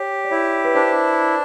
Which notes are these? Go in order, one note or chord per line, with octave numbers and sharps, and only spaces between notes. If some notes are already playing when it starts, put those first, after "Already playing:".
Already playing: G4 C#5
D5
E4 C#5
B4
D4 C5